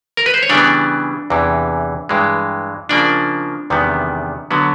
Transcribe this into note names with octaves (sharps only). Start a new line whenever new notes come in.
A#4
B4
C5
C#5
C#3 E3 G3 B3 D4 D5
E2 C3 E3
G2 E3 G#3
C#3 F3 A#3 D4 D5
E2 C3 D#3 G3 B3
D3 F#3 B3